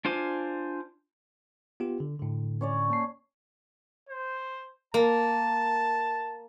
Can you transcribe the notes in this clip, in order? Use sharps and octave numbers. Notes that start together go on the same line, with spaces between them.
D4 F4 C5 G#5 D6
B3 F4 G4
D3
A2 D3
C#4 C#5 D5
A#3 A5 C7
C5
A#3 A5